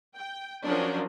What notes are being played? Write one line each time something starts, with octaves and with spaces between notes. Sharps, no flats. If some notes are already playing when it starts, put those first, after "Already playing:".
G5
F3 F#3 C#4 D4 A#4 C5